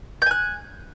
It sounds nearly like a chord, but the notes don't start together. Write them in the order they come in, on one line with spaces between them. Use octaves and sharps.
G6 G#5 F#6